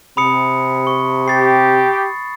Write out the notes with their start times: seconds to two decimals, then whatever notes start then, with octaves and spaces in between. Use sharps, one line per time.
0.17 C3 B5 D#6 C#7
0.87 C#6
1.28 G4 A6 C7